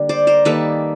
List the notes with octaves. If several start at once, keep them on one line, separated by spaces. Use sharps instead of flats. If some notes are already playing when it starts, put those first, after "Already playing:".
Already playing: D3 G3 A#3
C5 D5
A#4 C5
D#3 G3 A#3 A4 B4